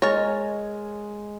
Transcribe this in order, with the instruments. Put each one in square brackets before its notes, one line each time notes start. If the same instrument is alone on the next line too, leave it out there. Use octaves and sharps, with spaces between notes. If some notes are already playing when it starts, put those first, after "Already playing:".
[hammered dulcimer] G#3 [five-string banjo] A#4 C#5 [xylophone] D#5 A6